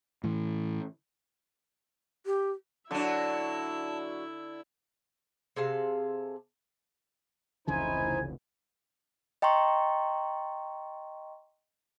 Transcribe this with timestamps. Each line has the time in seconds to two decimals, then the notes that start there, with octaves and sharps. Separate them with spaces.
0.24 A2 E3
2.26 G4
2.91 D3 F#3 D4 E4 E5 A5
5.56 C3 G#4 A4 F5
7.67 F1 C#2 C#3 E3 D#4 E4 C5 G#5
9.42 D#5 G5 A#5 C6 C#6